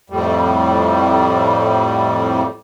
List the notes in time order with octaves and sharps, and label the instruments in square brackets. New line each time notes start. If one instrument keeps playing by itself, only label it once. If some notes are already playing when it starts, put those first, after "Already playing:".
[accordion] F2 A2 G3